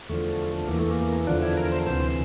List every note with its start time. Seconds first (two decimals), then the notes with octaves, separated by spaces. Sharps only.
0.09 E2 D3 F3 A3
0.68 E2 E3 A#3
0.79 A3
0.91 A#3
1.27 E2 D3 F3 D4
1.42 E4
1.57 A#4
1.72 C5
1.87 D2 C3 E3 C5